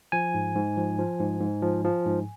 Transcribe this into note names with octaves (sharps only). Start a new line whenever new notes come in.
F3 G#5
G#2
G#2
F3
F3
G#2
G#2
F3
F3
G#2